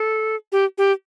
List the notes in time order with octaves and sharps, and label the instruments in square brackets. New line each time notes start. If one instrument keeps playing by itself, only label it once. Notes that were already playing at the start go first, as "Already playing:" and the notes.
Already playing: [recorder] A4
G4
G4